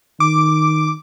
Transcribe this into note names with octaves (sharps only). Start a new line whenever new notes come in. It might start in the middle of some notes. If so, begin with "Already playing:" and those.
D#3 D6